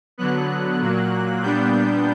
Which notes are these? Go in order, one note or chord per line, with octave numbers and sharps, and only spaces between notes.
D3 F#3 B3 F#6
A#2 F#3 A#3
A#2 G3 B3 D4 G6